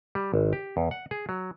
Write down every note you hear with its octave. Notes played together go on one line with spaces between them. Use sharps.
G3
G#1
G4
E2
F#5
G#4
F#3